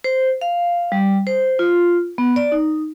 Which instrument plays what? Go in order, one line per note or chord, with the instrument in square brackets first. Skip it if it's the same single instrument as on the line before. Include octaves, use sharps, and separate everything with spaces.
[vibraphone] C5
F5
G3
C5
F4
B3
D5
D#4